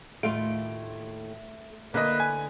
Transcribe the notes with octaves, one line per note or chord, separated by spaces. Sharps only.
D#2 A2 A3 F4 D7
D3 A3 A#3 E4 B4 D#5
G#5